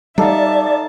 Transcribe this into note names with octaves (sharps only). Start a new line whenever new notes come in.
G3 D#4 A4 D5 E5 F5 A5